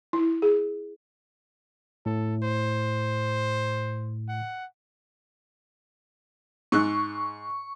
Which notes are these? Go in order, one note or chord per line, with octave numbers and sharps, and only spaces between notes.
E4
G#4
A2 A4
C5
F#5
G#2 C#6 E6 F#6